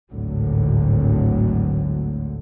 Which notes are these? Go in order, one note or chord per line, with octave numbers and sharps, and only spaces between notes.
G#1 D2 A2 D3 F#3